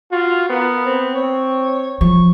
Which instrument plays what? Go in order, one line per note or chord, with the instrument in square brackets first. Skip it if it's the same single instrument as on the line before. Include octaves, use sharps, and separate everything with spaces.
[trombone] F4 [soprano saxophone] F#4
[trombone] B3 [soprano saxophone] A#4
[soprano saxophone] C4
[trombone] C4 [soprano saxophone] C#5
[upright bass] F3 [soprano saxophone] C#6